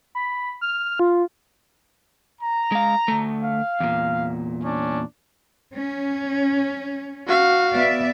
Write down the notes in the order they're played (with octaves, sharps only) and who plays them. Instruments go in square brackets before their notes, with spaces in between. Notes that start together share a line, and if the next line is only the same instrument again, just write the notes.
[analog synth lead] B5
F6
F4
[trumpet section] A#5
[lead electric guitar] G#3 F5
D2 A3
[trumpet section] F5
[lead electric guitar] E2 A#2
[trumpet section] C#4 D4
[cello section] C#4
[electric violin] F#4 F5
[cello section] B3 D5 E5